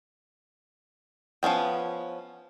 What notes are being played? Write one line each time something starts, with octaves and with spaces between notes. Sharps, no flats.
F3 B3 C#4 G5